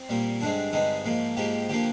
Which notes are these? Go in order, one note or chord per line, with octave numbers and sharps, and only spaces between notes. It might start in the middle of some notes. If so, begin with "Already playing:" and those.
Already playing: C4
A#2 G3 A#3
G2 D3 G#3 C4 D4
G2 D3 G#3 C4 D#4
G#2 F3 A#3
G#2 F3 A#3 G4
D3 F3 A#3 G4